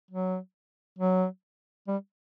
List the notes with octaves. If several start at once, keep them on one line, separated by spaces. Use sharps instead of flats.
F#3
F#3
G3